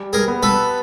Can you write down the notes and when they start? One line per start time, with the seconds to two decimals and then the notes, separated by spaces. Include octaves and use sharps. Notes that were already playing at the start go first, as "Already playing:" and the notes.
Already playing: G3
0.13 G#4 A#4
0.28 B3
0.43 A4 B4